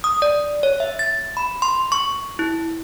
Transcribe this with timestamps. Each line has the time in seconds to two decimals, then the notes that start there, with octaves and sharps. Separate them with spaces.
0.04 D#6
0.22 D5
0.63 C#5
0.80 E5
0.99 A6
1.37 B5
1.62 C6
1.92 C#6
2.39 E4